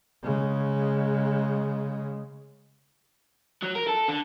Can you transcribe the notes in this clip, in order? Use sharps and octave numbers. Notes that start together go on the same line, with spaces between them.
C#3 G#3
F#3
A#4
A4
D3